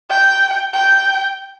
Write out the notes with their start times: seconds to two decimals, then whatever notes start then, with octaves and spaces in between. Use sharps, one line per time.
0.10 G5
0.74 G5